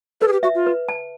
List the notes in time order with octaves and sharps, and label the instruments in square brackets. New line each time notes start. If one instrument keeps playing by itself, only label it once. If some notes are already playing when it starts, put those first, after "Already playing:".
[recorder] A4 [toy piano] B4
[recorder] G#4
G4
[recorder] F#4 [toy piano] E5
[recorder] F4
[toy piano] B4
A5